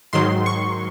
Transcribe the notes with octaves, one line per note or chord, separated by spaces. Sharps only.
G#2 D#3 F#3 C6
C#6